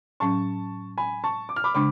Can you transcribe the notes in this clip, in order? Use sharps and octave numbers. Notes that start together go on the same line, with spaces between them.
A2 F#3 C#4 A5 C#6
G#5 B5
A5 C#6
D6
F6
B5 D6
C#3 G#3 D4 B5 D6